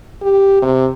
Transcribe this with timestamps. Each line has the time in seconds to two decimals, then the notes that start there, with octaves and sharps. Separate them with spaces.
0.22 G4
0.62 C3